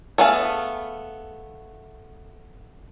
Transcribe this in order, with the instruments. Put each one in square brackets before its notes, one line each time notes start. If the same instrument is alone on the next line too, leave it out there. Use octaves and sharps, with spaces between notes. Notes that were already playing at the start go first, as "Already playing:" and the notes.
[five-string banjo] A3 B3 G#4 F5